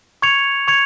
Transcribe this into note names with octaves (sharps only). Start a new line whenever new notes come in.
C#6 G#6 C#7 F7
C#6 G#6 C#7 F7